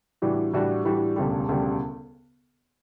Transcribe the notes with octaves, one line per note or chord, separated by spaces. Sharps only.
A2 E3 G3 D4 F#4
A2 E3 G3 D4 F#4
A2 E3 G3 D4 F#4
E1 D2 C#3 G3
E1 D2 C#3 G3